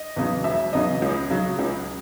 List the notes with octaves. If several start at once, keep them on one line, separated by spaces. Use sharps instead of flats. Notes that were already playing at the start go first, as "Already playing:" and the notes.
Already playing: D#5
E2 C#3 F#3
E1 E5
E2 C#3 F#3 D#5
C#2
C#3 F#3
C#2